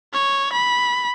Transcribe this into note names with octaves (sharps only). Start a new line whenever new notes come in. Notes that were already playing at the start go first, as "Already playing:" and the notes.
C#5
B5